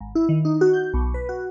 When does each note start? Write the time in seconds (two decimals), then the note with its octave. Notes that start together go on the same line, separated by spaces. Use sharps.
0.01 G#1
0.15 E4
0.29 D#3
0.45 D#4
0.61 F#4
0.73 G6
0.94 B1
1.14 B4
1.29 F#4